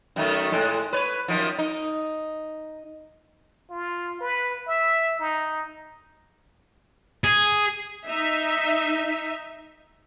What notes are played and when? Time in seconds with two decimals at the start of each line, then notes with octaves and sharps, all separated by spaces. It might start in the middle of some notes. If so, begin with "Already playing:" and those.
0.16 F#2 D#3 A3
0.52 A2 G#3 A4
0.93 B4 C#5
1.28 F#2 D#3 F3
1.58 D#4
3.70 F4
4.21 B4
4.67 E5
5.20 D#4
7.24 G#4
8.09 D#4 E5